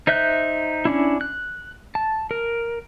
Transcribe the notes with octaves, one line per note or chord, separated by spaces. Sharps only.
D#4 C5 E5 F#6 G6
C#4 D4 E4
F#6
A5
A#4